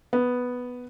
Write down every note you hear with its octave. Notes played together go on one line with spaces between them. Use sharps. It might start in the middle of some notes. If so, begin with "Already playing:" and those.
B3